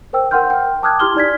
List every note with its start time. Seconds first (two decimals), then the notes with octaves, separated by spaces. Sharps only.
0.13 A#4 C5 G5 E6
0.31 A#4 F#5 G5 C6 F6 G6
0.50 G5
0.83 A5 D6 D#6 F6 F#6 G#6
1.00 E4 G4 C6 F6 G7
1.15 D#4 D5 G#6 B6